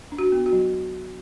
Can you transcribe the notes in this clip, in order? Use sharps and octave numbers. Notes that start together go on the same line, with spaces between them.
D4
F#4
B3
F#4
F#3